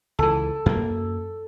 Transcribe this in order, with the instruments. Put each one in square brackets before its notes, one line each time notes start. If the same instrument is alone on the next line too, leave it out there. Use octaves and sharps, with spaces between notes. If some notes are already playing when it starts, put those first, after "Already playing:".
[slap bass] C#2 E3 [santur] A4
[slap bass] F#2 A#3